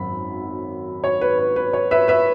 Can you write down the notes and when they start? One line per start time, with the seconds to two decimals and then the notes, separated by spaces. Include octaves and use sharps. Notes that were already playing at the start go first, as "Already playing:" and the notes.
Already playing: G#1 F#2 F#3 B5
1.04 C#5
1.21 B4
1.38 B4
1.56 B4
1.73 C#5
1.91 B4 E5
2.08 B4 E5